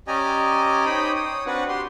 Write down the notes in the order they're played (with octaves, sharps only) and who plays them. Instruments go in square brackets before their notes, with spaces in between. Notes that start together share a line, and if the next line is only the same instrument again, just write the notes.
[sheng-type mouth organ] C#4 G4 D5 D#5 G#5 A#5
D#4 C5 C#5 G5 B5 D#6
C#5 D#6
C4 D4 F#4 B4 F#5
G4 C6